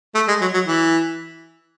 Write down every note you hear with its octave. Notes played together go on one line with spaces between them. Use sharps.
A3
G#3
F#3
F#3
E3